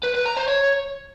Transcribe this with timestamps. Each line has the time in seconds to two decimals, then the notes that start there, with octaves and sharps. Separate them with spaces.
0.04 B4
0.15 B4
0.26 A#5
0.37 C5
0.48 C#5